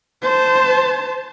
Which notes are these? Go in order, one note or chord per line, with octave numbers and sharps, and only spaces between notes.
C5 A5